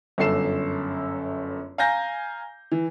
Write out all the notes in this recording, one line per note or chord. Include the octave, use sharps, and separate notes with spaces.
G1 F#2 A4 C7 E7
F5 G#5 A#5 G6 A#6
E3